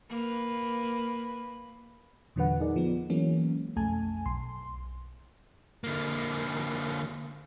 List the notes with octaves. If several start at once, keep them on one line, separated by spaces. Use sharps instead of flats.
A#3 B4
E2 A#2 D3 F#3 B4 F#5
D#4 G#4 A#4 D5
F3 B3
E3 F#3 G#3 A#3 C#4
B1 F2 A3 G#5 A5
B1 C6
D3 A#3